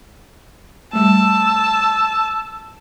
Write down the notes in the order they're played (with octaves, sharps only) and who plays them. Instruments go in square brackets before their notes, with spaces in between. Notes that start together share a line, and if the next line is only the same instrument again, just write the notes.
[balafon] G3 A3 [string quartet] A5 [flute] E6